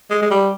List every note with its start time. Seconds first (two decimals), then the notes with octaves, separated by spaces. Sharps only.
0.11 G#3
0.22 G#3
0.31 G3